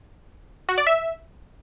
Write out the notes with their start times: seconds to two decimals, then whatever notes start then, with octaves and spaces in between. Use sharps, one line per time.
0.69 F#4
0.78 D5
0.87 E5